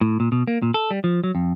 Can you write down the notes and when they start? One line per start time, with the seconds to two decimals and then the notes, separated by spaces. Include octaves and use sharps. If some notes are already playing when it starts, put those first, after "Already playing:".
0.01 A2
0.20 A#2
0.32 B2
0.47 A#3
0.62 A#2
0.74 A4
0.91 G3
1.04 F3
1.24 F#3
1.35 F2